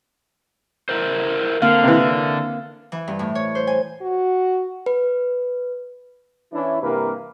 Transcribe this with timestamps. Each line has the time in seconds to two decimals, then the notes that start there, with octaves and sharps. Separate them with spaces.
0.89 E4 A#4 C5
1.62 D3 A#3 C4 F5
1.84 C3 E3
2.92 E3
3.08 G2
3.19 A2
3.35 C#5
3.55 C5
3.67 G#5
4.01 F#4
4.86 B4
6.53 E3 C#4 D4 E4
6.82 G2 C3 E3 A#3 A#4 B4